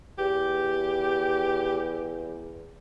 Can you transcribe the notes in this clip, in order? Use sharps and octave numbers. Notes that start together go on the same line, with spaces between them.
E2 G4